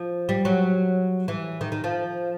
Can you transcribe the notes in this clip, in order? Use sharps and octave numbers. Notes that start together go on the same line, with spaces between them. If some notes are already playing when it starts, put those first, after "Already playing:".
Already playing: F3
G3
F#3
E3
D#3
D#3
F3